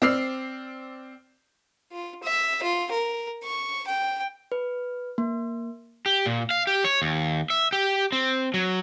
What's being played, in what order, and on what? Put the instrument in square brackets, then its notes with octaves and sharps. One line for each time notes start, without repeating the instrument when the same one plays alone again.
[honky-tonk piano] C4 D5 E6 F6 C7
[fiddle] F4
E5
F4
A#4
C#6
G5
[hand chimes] B4
A#3
[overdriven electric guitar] G4
A#2
F5
G4
C#5
D#2
E5
G4
C4
F#3